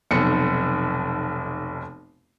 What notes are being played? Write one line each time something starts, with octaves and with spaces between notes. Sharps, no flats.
F1 B1 C#7